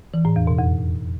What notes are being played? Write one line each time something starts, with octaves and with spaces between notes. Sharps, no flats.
E3
A2
E2
B2
F2